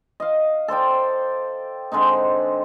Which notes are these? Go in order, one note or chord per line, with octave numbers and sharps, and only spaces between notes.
D#5 F5
A4 C5 D5 G5
D3 G#3 C4 D#4